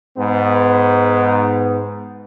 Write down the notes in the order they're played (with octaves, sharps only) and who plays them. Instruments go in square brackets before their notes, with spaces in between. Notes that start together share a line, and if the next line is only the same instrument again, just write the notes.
[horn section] G#2 B3